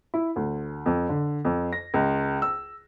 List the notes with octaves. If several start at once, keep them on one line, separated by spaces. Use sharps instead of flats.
E4
D2
F2
D3
F2
A#6
C#2
E6